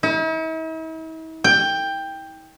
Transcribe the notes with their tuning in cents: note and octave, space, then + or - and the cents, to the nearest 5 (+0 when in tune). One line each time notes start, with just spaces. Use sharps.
E4 -45
G5 +10